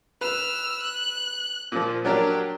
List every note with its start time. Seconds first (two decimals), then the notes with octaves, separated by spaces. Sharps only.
0.21 B4 E6 F6
0.82 F#6
1.72 A#2 F3
2.05 F#3 D4 G4 A#4